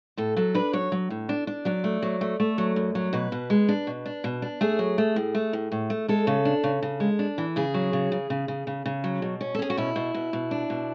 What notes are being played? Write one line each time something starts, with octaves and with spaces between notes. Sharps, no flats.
A2 A4
F#3 A4
D4 B4
F#3 C#5
F#3
A2
D4
D4
F#3 D5
A3
F#3
A3
A3
F#3
F#2
F#3
B2 B4
B2
G#3
D4
B2
D4
B2
D4
A3 G#4
F#3
A3
A2
A3
A2
A2
A3
G#3 A4
C#3
D4
C#3
C#3
G#3
D4
E3
C#3 G#4
F#3
C#3
C#3
C#3
C#3
C#3
C#3
F#3
B2
C#4
A4
C#4 G#4
F#4
B2 E4
B2
B2
B2
D4
B2